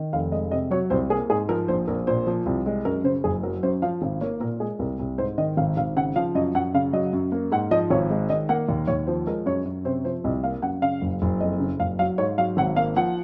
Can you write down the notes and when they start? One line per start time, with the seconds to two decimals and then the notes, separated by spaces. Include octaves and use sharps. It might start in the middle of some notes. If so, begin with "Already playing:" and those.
Already playing: D#3
0.13 F1 F5
0.32 G#3 D#5
0.51 C3 D#5
0.71 F#3 C#5
0.90 C2 C5
1.10 A#3 G#4
1.30 G#2 G#4
1.49 F3 A#4
1.68 A#1 C5
1.88 A#1 A#4
2.07 A#2 C5
2.27 F3
2.46 C2
2.66 G#3
2.85 F#2 A#4
3.04 C#3 C5
3.24 F#1 G#4
3.43 F#3 A#4
3.63 F#2 C5
3.82 F3 F5
4.02 G#1
4.21 A#3 C#5
4.40 A#2 A#4
4.60 G#3 G#4
4.79 C2 A#4
4.99 C2
5.18 G#2 C5
5.38 D#3 D#5
5.57 G#1 F5
5.77 G#1 F5
5.96 C#3 F#5
6.16 F3 F5
6.35 F#2 D#5
6.55 F#2 F#5
6.74 C#3 F5
6.93 F#3 D#5
7.13 F#2
7.32 A#3
7.52 G#2 F#5
7.71 F3 D#5
7.90 G#1 C#5
8.10 G#3
8.29 D#3 D#5
8.49 A#3 F#5
8.69 D#2
8.87 D#2 C#5
9.07 F3 C5
9.27 G#3 A#4
9.46 F#2 C#5
9.65 F#2
9.85 C3 C5
10.05 F3 C5
10.24 C2 D#5
10.44 A#3 F5
10.62 F#2 F#5
10.82 C#3 F5
11.02 F#1
11.22 F#1
11.40 F2 D#5
11.60 C#3
11.80 F#1 F5
11.99 F#3 F5
12.18 G#2 C#5
12.38 F#3 F5
12.57 G#1 F#5
12.76 A#3 F5
12.96 F3 F#5